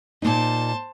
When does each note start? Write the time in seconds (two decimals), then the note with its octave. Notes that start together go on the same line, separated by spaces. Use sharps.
0.22 A#2 A#3 D#4 C5 A5